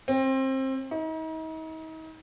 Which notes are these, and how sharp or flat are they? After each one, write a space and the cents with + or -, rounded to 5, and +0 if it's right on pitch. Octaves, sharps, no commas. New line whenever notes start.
C4 +25
D#4 +40